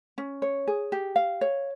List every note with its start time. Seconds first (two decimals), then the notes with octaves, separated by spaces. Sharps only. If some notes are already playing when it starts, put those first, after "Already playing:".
0.18 C#4
0.42 C#5
0.67 G#4
0.92 G4
1.16 F5
1.41 C#5